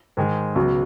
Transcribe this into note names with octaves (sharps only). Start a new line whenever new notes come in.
G#2 D#3 G#3
C#2 B2 F#3